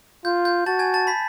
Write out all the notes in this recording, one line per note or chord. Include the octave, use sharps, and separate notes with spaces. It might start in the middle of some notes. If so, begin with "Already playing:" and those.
F4 G6
G6
F#4 A5 A6
G#5 G#6
A5 A6
B5 B6